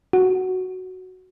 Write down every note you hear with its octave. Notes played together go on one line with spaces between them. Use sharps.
F#4